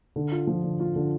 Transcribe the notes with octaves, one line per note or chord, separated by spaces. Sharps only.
D3
F4
F3
D3
F4
D3